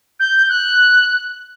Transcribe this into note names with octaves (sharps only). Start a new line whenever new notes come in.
G6
F#6